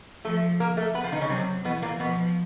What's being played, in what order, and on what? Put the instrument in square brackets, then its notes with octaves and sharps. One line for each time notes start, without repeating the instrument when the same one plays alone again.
[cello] F3 [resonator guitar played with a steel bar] A3 A4
[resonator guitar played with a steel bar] A#3 A#4
A3 A4
B3 B4
F3 F4
D#3 D#4
C#3 C#4
[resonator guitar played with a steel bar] C3 C4 [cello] F#3
[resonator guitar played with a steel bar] B2 B3 [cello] E3
[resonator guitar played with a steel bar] A#2 A#3
[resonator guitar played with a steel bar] B2 B3 [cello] F3